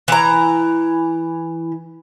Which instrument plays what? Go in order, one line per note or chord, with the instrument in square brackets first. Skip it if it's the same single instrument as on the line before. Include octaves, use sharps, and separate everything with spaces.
[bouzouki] E3 A#5